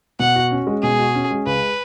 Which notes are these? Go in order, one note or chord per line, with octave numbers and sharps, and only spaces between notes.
B2 F#5
F#4
C#4
G#3
B2 G#4
F#4
C#4
G#3
C#2 B4